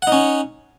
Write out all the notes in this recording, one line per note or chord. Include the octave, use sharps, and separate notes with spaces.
C#4 D#4 F#5